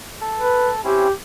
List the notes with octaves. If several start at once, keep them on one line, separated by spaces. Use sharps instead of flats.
A4
B4
C4 C#4 E4 G4